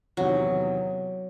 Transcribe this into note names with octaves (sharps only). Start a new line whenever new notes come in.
E2 C3 D#3 F#3